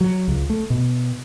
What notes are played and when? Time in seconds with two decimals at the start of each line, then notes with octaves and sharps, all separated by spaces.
0.01 F#3
0.28 C#2
0.50 A3
0.70 B2